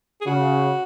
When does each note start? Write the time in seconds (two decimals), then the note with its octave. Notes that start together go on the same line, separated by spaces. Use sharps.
0.21 G#4
0.26 C#3 F#4